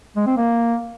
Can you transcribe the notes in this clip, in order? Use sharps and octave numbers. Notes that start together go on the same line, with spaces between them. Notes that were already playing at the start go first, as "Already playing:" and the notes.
G#3
C4
A#3